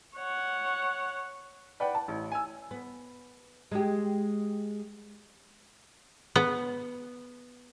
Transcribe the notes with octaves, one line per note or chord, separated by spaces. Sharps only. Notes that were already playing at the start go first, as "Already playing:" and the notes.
C#5 F#5
B4 D5 F#5 G5
A5
A1
G#5 E6
B3
G#3 G4
B3